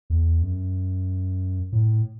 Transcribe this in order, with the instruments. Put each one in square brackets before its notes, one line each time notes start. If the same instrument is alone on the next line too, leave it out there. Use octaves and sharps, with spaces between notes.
[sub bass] E2
F#2
A2